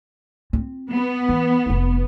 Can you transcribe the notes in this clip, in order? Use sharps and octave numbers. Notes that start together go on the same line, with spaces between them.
C4 F4
B3
E3
F1 F4